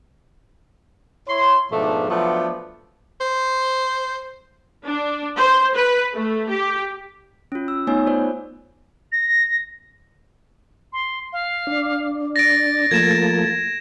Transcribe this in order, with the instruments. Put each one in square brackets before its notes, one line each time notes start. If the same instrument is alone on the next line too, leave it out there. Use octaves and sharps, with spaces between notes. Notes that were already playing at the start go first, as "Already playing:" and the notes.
[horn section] E4 C#5 C6
G#2 B2 F3 A3 D4
F3 F#3 A3 B3 D4
[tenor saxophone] C5
[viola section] D4
C5
B4
A3
G4
[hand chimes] C#4 F4
E6
A3 B3 D#4 C#5 G#5
F4 C5 D5
[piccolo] A#6
C6
F5
[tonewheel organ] D4
[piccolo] A6 [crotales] A#6 D7
[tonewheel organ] F3 A3 A#3 [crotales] G#6 E7